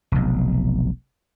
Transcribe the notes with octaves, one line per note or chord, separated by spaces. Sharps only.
F1 B1